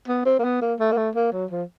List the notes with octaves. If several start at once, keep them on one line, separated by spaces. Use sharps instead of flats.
B3
C4
A#3
B3
A#3
A3
A#3
A3
A#3
F#3
F3